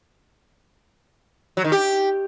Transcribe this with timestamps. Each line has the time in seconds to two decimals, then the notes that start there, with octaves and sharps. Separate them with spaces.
1.57 F#3
1.64 D#3
1.72 G4